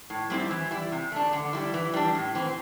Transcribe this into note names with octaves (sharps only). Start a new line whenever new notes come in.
A2
G3 C4 E4
E3
G3 E4
C3
A3 D4
D3
G3 E4
E3
G3 D4
A2
E3 C4